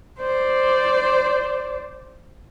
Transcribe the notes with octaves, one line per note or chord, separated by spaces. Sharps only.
C5 D5